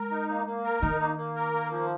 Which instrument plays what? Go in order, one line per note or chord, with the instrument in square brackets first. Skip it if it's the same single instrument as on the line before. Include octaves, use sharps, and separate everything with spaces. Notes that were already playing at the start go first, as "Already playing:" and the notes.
Already playing: [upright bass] G#3 [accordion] A#4
[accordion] D#4
A#3
A#3
A#4
[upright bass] D#3 [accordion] D#4
[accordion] A#3
A#3
A#4
A#3
F3